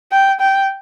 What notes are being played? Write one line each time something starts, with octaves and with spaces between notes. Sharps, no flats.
G5
G5